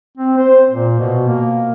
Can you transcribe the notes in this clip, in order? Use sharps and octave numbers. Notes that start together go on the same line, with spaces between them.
C4
C5
A#2
B2
A#3